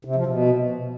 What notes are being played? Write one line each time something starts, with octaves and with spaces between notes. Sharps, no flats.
C3
F3
B2